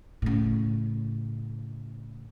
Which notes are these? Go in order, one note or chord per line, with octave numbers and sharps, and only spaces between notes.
A2 C#3